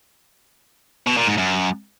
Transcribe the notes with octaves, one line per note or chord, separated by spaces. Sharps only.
B2
A#2
G#2
F#2